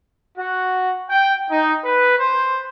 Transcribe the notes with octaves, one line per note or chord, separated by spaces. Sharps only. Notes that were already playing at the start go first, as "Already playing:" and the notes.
F#4
G5
D#4
B4
C5